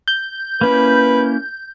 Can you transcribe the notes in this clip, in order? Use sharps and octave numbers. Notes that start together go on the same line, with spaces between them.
G6
A#3 C#4 E4 B4